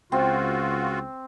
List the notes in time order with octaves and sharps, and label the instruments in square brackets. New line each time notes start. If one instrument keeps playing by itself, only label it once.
[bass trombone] C#2 [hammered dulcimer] C4 [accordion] F4 F#4